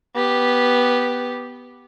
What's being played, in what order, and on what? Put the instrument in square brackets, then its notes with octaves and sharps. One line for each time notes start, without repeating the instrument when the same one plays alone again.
[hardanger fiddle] B3 G4